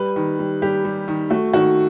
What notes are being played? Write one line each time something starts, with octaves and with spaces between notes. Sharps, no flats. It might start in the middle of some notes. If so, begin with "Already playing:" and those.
Already playing: G3 B4
D#3
G3
G3 G4
G3
D#3
A3 F#4
D#3 F#4